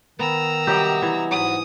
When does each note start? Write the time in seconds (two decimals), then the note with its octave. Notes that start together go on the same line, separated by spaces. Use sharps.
0.19 D#3 B3 A#5 E6
0.67 C3 F#3 G3 G4 D#5
1.02 E3
1.31 G#2 F#3 B3 D#6